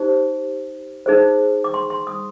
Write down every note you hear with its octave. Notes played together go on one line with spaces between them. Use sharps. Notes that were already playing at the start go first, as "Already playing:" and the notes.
Already playing: D#4 G4 C5
D#4 G#4 C5
D6
C6
C6
D#6